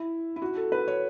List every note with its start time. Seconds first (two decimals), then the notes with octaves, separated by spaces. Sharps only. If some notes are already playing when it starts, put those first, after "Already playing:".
Already playing: E4
0.36 E4
0.42 F#4
0.56 A4
0.72 B4
0.88 C#5